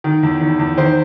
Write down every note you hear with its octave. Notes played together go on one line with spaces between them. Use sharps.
D#3
E2
D#3
E2
D#3 C5